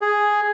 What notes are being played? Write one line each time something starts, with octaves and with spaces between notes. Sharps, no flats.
G#4